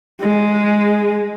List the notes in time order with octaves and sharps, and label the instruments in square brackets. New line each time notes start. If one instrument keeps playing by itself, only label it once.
[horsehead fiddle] G#3